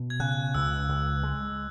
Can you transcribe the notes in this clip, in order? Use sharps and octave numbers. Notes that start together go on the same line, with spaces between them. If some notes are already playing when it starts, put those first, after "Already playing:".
Already playing: B2
G#6
C#3 F#6
C#2 E6
C#2
G#3